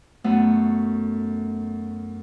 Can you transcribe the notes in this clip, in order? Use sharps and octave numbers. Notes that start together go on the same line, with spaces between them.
F#2 A3 B3